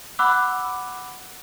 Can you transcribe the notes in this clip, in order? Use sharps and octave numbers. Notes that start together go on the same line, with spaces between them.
F#5 B5 D6 E6 F#6